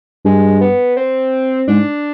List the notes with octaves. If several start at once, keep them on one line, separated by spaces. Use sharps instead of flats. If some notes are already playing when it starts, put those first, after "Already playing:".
G2 G#3
B3
C4
G#2 D4